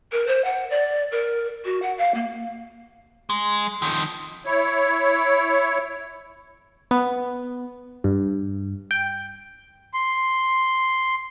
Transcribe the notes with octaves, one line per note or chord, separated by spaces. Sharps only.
A#4
C5
F#5
D5
A#4
F#4
F#5
F5
A#3
G#3
D#3 F3
E4 C#5
B3
G2
G5
C6